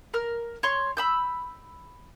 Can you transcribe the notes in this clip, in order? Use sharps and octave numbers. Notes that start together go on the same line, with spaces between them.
A#4 F6
C#5 C6
B5 E6 G6